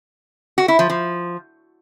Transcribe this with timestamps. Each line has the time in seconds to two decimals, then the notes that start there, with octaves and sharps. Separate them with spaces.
0.58 F#4
0.68 E4
0.79 F3
0.90 F3